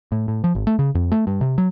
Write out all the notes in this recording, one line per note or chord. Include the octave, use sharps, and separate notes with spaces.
A2
A2
F3
G#1
A3
C#3
F2
A3
G2
C3
F#3